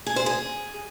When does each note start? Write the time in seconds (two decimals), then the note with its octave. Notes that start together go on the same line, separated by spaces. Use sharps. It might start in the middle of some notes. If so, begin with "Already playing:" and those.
0.06 G#4
0.16 C5
0.26 G#4